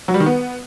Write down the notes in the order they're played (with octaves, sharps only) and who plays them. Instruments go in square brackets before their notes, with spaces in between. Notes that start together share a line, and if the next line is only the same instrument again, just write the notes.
[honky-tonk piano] F#3
G3
D#3
B3